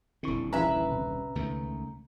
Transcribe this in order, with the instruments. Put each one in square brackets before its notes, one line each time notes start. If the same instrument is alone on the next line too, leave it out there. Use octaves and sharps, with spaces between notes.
[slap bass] D#1 D3 [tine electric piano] C4 E4 C#6
[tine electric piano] B1 C#4 A#5 [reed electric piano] E3 E4 G#5 [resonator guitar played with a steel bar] B4 E5
[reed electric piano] C3
[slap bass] C#2 D#3 A3